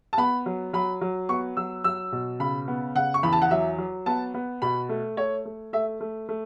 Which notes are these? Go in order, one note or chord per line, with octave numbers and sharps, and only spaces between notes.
A5
B3 B5
F#3
F#3 B5
F#3
B3 C#6
F#3 E6
F#3 E6
B2
C#3 B5
B3
C#3 F#5
C#6
E2 B5
A5
F#5
F#3 E5
F#3
B3 A5
B3
B2 B5
A3
A3 C#5
A3
A3 E5
A3
A3